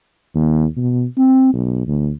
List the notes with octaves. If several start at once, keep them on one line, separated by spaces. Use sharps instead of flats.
D#2
B2
C4
B1
D2